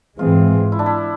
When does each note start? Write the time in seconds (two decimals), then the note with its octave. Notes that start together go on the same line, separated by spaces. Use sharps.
0.19 G#2 E3 G#3 C4 F4
0.72 E4
0.79 D4
0.86 E4